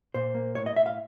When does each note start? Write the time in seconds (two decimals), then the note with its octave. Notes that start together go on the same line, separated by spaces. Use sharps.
0.14 A#2 C5
0.35 A#3
0.55 A2 C#5
0.66 D#5
0.76 A2 E5
0.86 F5